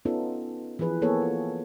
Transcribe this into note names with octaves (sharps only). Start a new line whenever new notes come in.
B3 C#4 D#4 F4 A4
E3 F3 G#4 B4
A#3 B3 G#4 A4 C#5
F4